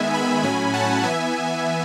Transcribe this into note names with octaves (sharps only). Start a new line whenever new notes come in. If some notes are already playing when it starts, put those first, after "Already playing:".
Already playing: D#3 G#3 B3 E5 G#5
G#5 B5
A2 F#3 C#4 G#5 B5
F#5 A5
E3 B3 E5 G#5